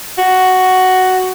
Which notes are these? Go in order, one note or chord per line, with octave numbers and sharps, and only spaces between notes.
F#4